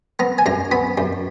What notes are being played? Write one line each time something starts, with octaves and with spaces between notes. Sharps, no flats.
B3 A#5
G#5
F#2 A#5
B3 B5
F#2